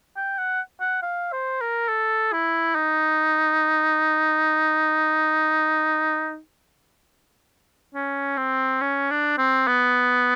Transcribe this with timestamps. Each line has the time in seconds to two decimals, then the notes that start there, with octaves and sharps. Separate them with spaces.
0.17 G5
0.38 F#5
0.81 F#5
1.02 F5
1.32 C5
1.61 A#4
1.89 A4
2.33 E4
2.75 D#4
7.95 C#4
8.37 C4
8.81 C#4
9.10 D4
9.38 C4
9.67 B3